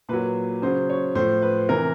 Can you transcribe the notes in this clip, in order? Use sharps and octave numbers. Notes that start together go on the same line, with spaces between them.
A#2 F#3 B4
C#3 F#3 C5
C#5
A2 F3 C5
B4
C3 E3 A#4